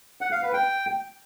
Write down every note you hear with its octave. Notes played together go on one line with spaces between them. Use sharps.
F#5
F5
B4
G5